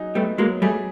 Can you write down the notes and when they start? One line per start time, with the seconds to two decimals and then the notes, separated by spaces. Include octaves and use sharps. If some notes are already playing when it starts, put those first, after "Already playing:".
Already playing: F#3 D#4 G#4
0.15 G3 A3 B3
0.38 F#3 G#3 A#3
0.62 G3 A3 G#4